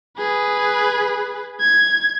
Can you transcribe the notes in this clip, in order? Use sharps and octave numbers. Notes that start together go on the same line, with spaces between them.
G#4 B4
G#6